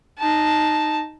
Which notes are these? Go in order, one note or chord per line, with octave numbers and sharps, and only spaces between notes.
D#4 A5